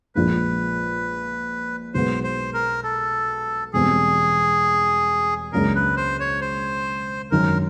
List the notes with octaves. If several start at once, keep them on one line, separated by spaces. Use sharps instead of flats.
A#1 A#2 F3 G#3 B4
B1 B2 G#3 B3 C5
C5
A#4
A4
E1 E2 B2 G3 C4 G#4
C#2 C#3 F#3 A#3 D4 A#4
B4
C5
C#5
C5
G#1 F#2 D#3 F#3 A#4